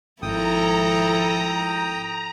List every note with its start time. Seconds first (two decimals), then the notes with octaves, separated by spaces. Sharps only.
0.22 G#1 F3 E4 A4 G5 A#5 D#6